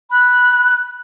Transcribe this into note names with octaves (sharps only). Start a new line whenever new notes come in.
B5 F#6